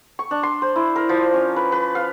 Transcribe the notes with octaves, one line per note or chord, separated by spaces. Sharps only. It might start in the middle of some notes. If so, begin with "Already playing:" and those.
C#6
D4
C6
C5
E4
A#4
F3
C#4
B4
B4
F5